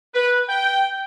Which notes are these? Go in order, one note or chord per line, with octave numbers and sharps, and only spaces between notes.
B4
G5